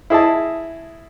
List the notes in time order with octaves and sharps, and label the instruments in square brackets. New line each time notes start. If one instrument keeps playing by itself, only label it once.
[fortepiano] E4 G#4 D#5 A5